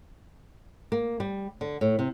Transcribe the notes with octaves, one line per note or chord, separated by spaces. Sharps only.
A#3
G3
D3
A2
C3